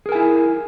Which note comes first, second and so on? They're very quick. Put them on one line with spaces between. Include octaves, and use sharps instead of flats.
G#4 A#4 G#5 E4